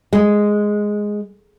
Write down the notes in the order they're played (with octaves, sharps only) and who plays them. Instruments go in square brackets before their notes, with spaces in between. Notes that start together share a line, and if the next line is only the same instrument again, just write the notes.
[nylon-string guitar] G#3